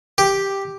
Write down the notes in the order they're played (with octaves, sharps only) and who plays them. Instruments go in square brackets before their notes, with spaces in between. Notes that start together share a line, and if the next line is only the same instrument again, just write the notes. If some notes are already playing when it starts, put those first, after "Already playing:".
[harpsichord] G4